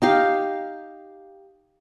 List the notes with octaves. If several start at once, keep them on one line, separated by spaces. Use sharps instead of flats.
D#4 G4 F5